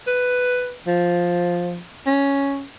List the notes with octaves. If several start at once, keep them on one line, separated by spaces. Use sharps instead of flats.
B4
F3
C#4